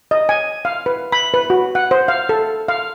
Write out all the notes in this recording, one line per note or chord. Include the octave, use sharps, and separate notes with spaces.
D#5
G#5
F5
B4
B5
B4
F#4
F#5
C5
F5
A4
F5